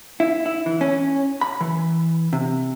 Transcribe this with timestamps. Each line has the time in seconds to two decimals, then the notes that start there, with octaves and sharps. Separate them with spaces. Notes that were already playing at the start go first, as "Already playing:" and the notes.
0.20 E4
0.46 E4
0.66 E3
0.81 C#4
1.41 B5
1.61 E3
2.33 C3